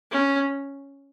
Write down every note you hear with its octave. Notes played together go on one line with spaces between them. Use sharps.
C#4